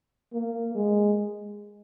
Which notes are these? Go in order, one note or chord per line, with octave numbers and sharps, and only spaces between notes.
A#3
G#3